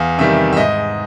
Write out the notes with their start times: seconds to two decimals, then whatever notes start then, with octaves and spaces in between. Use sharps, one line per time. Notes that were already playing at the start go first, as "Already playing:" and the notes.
Already playing: E2 F5
0.18 C3 D#3 G3 E5
0.53 E5
0.57 G#2 D#5